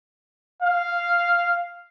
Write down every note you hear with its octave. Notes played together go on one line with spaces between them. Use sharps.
F5